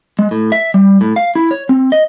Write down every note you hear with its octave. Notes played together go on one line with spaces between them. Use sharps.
G#3
A2
E5
G3
A2
F5
E4
C#5
C4
D#5